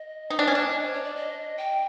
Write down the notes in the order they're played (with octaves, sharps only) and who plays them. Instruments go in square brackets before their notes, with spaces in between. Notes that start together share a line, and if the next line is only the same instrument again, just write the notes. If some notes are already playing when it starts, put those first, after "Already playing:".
Already playing: [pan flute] D#5
[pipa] D#4
D4
C#4
D4
[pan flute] C5
C#5
D5
D#5
G5